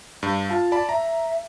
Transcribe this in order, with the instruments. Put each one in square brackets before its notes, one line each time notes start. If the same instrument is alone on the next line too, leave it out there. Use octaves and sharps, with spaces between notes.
[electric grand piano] G2
[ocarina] F4 [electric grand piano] F5 A5
[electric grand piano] D5 A5 B5
[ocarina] E5 [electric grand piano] A#5